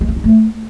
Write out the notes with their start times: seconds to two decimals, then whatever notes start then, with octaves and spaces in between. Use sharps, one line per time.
0.01 G#3
0.09 B3
0.16 D#4
0.24 A3